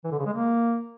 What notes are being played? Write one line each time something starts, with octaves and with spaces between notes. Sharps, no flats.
E3
D3
C#3
G#3
A#3